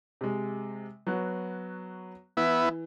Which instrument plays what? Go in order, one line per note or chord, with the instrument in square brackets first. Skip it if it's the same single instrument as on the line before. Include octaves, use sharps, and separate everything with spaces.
[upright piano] C3 G#3
F#3 B3 F#4
[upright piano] E3 [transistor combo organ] B3 E4